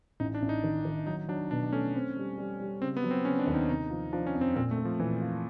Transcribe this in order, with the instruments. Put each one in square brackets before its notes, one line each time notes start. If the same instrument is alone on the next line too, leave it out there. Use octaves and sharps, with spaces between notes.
[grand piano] A1 [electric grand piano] D#4
[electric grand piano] D4
[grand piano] A1
[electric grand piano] D#4
[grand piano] D#3
D#3
[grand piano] F#3 [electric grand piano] D#4
[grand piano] F#3 [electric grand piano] D4
[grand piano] B2 [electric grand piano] D4
[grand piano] A3 [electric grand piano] C#4
[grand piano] C4
G3
G3
G3
[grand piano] C#3 [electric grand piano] C4
[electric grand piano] B3
[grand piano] F#3
[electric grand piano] C4
[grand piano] C#3 [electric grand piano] C#4
[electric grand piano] D4
[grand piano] D#2
[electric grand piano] D#4
[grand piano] C3 [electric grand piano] D#4
[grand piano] F3
[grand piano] F3 [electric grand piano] D4
[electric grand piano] C#4
[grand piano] F2
[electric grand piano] C4
[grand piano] A#2 [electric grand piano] C4
[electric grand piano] A3
[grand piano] A#2
[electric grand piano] F3
[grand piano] A#2 [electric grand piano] E3
[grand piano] F4